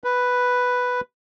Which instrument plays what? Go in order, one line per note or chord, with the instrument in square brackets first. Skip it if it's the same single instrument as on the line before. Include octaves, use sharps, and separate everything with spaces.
[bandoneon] B4